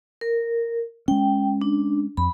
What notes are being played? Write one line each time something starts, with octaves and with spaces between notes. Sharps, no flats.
A#4
G#3 C#4 G5
D4
F2 B5